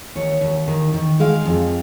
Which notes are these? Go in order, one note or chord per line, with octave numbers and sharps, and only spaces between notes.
D#2 C#5
D#2
D#3
D#3
G#3 F5
F2